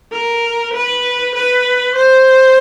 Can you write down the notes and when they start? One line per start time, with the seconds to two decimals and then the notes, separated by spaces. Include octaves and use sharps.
0.12 A#4
0.74 B4
1.35 B4
1.95 C5